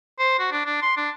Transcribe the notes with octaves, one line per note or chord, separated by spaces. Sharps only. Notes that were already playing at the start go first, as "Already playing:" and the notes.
C5
F#4
D4
D4
C6
D4